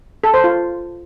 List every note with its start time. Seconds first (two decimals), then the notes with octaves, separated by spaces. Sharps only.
0.24 A4
0.34 C5
0.44 F4